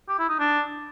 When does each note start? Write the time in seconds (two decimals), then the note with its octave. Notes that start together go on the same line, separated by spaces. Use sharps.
0.09 G4
0.19 E4
0.29 D#4
0.39 D4